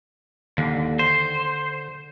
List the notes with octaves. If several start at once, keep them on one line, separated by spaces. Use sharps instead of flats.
D#2 D3
C5